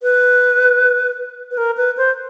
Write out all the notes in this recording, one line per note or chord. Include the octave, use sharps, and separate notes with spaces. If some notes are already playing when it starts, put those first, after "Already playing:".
B4
B4
A#4
B4
C5